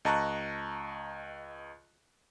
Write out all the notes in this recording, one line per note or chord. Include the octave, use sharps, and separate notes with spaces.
C#2 D#5 A5 A#5 C#6 F#6